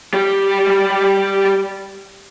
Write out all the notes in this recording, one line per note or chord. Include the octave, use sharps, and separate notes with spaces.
G3 G4